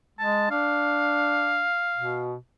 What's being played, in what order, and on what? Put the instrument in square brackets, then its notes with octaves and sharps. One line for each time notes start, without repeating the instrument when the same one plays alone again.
[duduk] G#3 [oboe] A5
[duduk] D4 [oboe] F5
[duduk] B2